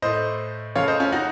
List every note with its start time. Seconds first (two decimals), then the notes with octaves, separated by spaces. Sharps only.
0.02 A2 A3 C5 D#5
0.75 C#3 F3 A3 C#5 F5
0.88 C5 D#5
1.00 C#4 F4
1.12 D#4 F#4